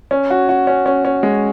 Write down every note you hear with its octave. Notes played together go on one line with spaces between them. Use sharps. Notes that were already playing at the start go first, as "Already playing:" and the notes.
C#4
F#4
F#4
C#4
C#4
C#4
G#3